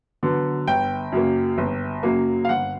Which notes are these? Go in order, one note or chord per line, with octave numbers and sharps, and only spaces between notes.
D3 F#3 B3
G1 G5
F#2 C#3 F#3 A#3
G1
F#2 C#3 F#3 A#3
F5
G1 F#5